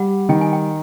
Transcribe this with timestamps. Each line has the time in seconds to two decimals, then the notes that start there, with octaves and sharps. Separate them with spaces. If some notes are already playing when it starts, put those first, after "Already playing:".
Already playing: G3 F#5
0.29 D#3 G5
0.41 G#5
0.53 G5